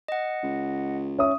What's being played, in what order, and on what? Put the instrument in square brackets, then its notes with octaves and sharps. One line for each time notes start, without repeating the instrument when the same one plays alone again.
[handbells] D#5 F#5
[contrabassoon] C#2
[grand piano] C#4 E5 D#6